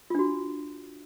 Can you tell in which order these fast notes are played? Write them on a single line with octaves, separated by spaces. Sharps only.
F4 D4 F#4